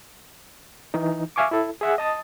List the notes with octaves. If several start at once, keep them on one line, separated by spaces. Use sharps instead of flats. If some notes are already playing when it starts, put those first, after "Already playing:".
E3 D#4
E5 F5 G#5 C#6 D6
E4 A4
G#4 E5 F#5
D#5 A5 D#6 A6